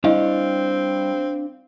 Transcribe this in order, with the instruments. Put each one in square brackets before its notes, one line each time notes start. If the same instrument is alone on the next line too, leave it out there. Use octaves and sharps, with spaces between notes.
[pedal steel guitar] G3 [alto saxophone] C4 [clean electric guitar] D4 F5 [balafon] E4 D#5